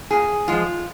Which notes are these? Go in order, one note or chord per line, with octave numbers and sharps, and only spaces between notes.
A#2 G#4
F3 G#3 F4